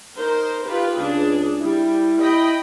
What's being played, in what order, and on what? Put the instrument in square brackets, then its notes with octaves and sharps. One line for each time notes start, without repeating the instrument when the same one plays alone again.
[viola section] D#4 A#4 C5
F4 G4 B4
[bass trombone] C#2 [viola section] D4 G#4
[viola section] G3 [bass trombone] E4
[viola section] D#5 G5 B5